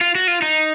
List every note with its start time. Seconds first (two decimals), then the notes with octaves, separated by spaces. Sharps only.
0.01 F4
0.15 F#4
0.28 F4
0.42 D#4